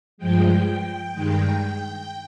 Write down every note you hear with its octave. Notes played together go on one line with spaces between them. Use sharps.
G2 F3 G#3 G5
G2 D#3 G#3 G5